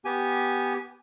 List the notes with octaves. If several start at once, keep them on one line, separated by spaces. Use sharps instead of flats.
B3 G4 G#5